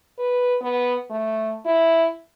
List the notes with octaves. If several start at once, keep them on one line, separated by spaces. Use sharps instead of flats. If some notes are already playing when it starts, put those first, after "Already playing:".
B4
B3
A3
E4